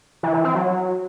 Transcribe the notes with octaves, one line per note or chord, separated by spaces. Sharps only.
E3
E3
C4
F#3